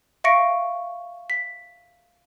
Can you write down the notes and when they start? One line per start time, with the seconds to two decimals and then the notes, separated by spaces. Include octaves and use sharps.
0.24 E5 F5 C#6 A#6 C#7 D7
1.30 B6